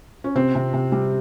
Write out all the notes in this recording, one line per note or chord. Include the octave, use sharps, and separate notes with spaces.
C#4
C3 C4
C3
C3
G3